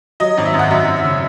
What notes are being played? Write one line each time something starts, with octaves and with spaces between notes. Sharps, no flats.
F#3 D#5
G#1
E5
F#2
F#5
F#2 E5
F#2
E5
C#3